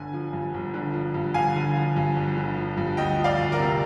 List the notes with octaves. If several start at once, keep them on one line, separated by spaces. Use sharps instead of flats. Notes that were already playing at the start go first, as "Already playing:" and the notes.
Already playing: G1 D3 G#5
F3
G2
G1
D3
F3
G2
G1 F5 G#5
D3
F3
G2
G1
D3
F3
G2
D2 D#5 G5
F3
D5 F5
D2
A#4 D5
C3